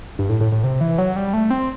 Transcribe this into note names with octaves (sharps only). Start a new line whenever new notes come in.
G2
A2
A2
A2
C3
E3
F#3
G3
A3
C4